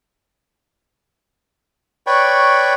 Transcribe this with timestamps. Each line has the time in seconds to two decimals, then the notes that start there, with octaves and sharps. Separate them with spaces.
2.07 B4 C#5 D5 G5 B5 C#6